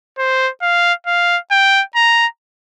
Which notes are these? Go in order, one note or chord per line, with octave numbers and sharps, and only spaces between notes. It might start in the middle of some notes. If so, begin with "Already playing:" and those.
C5
F5
F5
G5
A#5